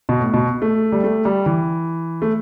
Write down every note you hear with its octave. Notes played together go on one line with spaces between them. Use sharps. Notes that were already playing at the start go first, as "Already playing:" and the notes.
B2
A2
B2
A3
G3
A3
G3
E3
A3